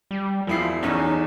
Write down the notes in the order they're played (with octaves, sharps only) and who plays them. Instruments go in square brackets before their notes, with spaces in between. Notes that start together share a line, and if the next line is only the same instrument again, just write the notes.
[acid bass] G3
[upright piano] E1 E4 C7 [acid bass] F3
[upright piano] B1 E2 [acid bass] C#4 [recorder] D#4